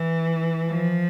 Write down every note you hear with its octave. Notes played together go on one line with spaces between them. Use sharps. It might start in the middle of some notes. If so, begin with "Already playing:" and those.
Already playing: E3
F3